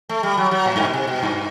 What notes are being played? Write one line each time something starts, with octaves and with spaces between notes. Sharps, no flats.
A3
G3
F#3
F#3
A2
G2
B2
C3
B2
G2